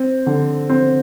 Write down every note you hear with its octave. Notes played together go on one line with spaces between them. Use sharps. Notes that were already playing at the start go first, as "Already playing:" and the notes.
Already playing: C4
D3
C4